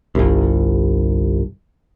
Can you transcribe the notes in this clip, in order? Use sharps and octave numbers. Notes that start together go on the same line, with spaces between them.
G1 C2